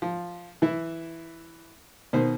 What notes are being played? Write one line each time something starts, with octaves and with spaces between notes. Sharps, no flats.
F3
E3 E4
B2 D#3 C5